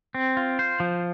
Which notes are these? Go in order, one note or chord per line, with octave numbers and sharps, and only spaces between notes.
C4
F4
C5
F3